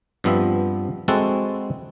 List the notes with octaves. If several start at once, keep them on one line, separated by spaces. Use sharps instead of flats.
G2 F3 B3 C4 E5
G#3 C4 E4 F#4 A4 F#5